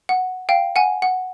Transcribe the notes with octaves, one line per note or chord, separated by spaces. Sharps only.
F#5
F5 G5
F#5 G#5
F#5